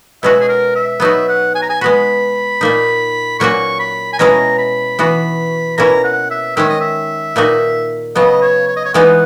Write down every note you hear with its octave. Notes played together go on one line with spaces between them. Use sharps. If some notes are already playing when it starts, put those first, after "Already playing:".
B2 G#3 C#4 F#4 E5
G#4
A#4
E5
F#3 B3 D#4 F#4 E5
F#5
G#5
A#5
G#5
G#3 B3 F#4 B5
A#2 A#3 D#4
A#2 F#3 A#3 C#4 F#4 C#6
B5
G#5
B2 G#3 C#4 E4 G#4 A#5
B5
E3 B3 F#4
B2 A#3 C#4 E4 A#5
F#5
E5
D#3 G#3 C#4 E5
D#5
E5
A#2 A#3 D#4 F#4
C#3 F#3 B3 D#5
C#5
C#5
D#5
C#5
E3 G#3 B3 D#4 F#5